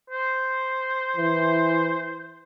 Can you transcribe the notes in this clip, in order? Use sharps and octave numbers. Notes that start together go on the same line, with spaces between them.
C5
E3